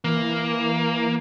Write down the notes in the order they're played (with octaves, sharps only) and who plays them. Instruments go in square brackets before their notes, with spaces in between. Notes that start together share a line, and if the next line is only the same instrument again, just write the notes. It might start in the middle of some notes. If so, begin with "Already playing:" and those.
[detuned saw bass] E3 [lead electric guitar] A#3